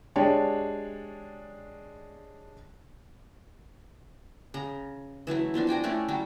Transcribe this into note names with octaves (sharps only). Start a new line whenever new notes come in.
G#3 D4 G4 C#5 A5
C#3 A#5
E3 F#3 A3 E4
F3 B3 D4 F#4
D4 G5 G#5 A#5
A3 C#4 E4 D5
F#3 G3 F#4 G4